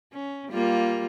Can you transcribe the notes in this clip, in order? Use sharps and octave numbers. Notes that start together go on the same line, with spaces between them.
C#4
G3 A#3 F4